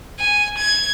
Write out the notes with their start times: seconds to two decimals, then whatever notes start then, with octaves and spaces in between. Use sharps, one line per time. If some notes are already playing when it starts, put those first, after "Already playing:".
0.19 G#5
0.58 G#6